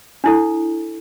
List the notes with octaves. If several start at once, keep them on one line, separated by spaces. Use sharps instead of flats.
D4 E4 A4